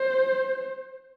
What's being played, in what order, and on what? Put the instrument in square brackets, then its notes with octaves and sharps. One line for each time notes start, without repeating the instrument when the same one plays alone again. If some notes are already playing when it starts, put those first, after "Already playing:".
Already playing: [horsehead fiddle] C5